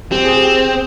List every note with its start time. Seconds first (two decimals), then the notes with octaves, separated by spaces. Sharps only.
0.11 C4 G4
0.24 G#4
0.36 G4